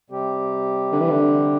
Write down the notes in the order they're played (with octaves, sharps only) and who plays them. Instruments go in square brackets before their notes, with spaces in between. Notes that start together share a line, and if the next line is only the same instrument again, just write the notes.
[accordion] C3 G3 C4 G4
[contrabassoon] D3
E3
D3